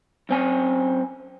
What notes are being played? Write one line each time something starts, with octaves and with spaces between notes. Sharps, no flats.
F#2 C4 G#5